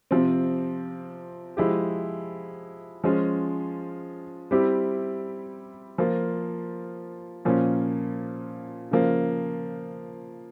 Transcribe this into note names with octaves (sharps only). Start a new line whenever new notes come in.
C3 F3 C4
F3 G#3 E4 G4
F3 G#3 C#4 F4
G3 C4 E4 G4
F3 A#3 F4
A#2 F3 A#3 C#4
C#3 F3 A#3